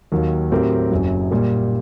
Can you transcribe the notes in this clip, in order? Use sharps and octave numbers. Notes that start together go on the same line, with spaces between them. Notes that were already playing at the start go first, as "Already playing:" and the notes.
D#2 D#3 F#3 A#3
A2 F#3 C4 G4 A#4
F#1 F#2 F#3
A#2 G3 A#3